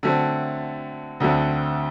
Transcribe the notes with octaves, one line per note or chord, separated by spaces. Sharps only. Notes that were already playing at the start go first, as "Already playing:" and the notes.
D3 F#3 A3 C4
D2 D3 F#3 A3 C4